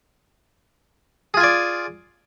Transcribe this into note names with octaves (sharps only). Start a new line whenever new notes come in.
F4 G#4 D5 G#5